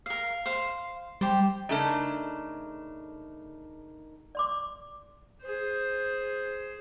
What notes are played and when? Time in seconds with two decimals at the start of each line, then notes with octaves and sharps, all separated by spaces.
0.06 A#4 F5
0.46 C5 F5 C6
1.21 G3 G4 C5
1.69 C#3 A3 D4 D#4 A#4
4.35 D5 C6 D6
5.42 G#4 C5